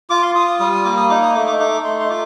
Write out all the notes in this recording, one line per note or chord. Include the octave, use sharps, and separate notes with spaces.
F4 D6
C6
F4 D#6
D#6
G3 D#6
D#6
A#3 D6
D#6
D#4 D6
D#6
A3 D6
D6
D#4 D6
A3 C6
C6
F4 D6